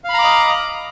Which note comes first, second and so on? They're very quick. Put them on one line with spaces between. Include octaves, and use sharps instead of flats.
F5 B5 A#5 D6 D#5